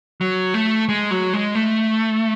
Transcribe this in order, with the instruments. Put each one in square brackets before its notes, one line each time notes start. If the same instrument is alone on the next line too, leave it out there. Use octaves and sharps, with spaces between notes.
[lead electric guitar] F#3
A3
G#3
F#3
G#3
A3